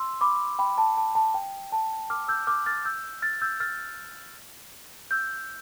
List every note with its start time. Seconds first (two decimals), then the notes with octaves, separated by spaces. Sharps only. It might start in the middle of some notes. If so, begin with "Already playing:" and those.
Already playing: C6 E6
0.21 B5 D6
0.59 G5 B5
0.78 A5
0.97 A5
1.15 A5
1.34 G5
1.72 A5
2.10 D6 F6
2.28 E6 G6
2.47 D6 F6
2.66 F6 A6
2.85 E6 G6
3.22 F6 A6
3.41 E6 G6
3.60 F6 A6
5.11 E6 G6